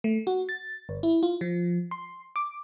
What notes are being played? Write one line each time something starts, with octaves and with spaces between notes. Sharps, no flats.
A3
F#4
A6
G1
E4
F4
F3
C6
D6